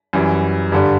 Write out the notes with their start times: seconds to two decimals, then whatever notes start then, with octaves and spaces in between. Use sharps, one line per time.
0.13 F#2 E3 G3
0.72 G2 D3 G3